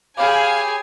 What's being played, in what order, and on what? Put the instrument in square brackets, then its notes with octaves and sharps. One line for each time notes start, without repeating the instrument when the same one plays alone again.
[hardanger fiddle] G4 G#4 [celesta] C#5 B5 D6 [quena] F5 [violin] G#5